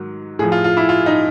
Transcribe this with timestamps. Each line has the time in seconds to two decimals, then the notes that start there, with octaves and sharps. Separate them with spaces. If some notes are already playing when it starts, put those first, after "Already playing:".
Already playing: G#2 D#3 F#3
0.39 A2 F3 G#4
0.52 F4
0.64 F4
0.77 E4
0.89 F4
1.06 D#4